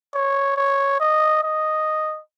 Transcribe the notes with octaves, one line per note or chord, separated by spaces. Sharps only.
C#5
C#5
D#5
D#5